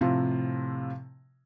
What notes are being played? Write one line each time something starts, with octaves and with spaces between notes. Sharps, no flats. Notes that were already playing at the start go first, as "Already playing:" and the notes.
A2 C3 F3 C4 F4